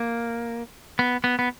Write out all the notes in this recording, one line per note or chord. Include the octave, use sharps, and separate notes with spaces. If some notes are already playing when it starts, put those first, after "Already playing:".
Already playing: A#3
B3
B3
B3